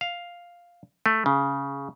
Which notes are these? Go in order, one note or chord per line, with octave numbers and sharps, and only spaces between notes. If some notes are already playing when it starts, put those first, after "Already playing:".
F5
A3
C#3